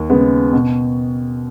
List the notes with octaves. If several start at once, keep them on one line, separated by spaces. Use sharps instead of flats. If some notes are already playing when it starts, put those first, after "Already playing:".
Already playing: D#2
C#3 G#3 B3
B2